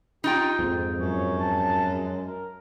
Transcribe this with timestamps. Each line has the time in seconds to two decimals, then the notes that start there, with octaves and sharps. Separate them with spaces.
0.24 D#4 F4 G4 G5
0.59 F2 G#2 C4
0.99 F#2 C#5
1.39 A5
1.93 G#3
2.25 A#4